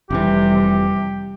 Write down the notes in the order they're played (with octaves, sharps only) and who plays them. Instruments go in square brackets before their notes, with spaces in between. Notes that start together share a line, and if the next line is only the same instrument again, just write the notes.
[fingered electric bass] F1 E3 [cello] C3 G3 [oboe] G4